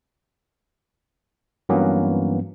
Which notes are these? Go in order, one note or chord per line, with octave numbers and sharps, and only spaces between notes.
G2 E3 F#3 A#3 B3 C#4